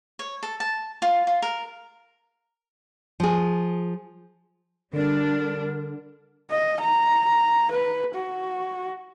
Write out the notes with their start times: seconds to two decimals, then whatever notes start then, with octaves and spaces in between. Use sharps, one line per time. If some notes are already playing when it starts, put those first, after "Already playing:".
0.19 C#5
0.43 A4
0.60 A5
1.02 F4
1.27 F4
1.42 A#4
3.20 F3 G#4
4.93 D3 G3 D4 A#4
6.51 D#5
6.81 A#5
7.71 B4
8.15 F#4